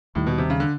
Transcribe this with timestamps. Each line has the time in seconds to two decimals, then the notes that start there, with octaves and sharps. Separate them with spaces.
0.15 D#2 A2 D#3 G3
0.27 B2
0.38 C3
0.50 C#3
0.60 D3